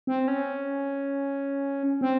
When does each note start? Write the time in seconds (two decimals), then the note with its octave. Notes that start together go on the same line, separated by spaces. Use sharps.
0.07 C4
0.28 C#4
2.01 C4